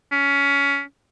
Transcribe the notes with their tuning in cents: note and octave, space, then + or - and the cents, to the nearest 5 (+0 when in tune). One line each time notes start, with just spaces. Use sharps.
C#4 +20